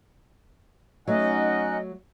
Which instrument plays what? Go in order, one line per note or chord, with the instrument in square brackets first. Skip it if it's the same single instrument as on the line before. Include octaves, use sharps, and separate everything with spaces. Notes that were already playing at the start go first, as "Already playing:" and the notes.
[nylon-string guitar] F#3 A3 [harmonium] C#4 D#4 F#5 [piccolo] D#5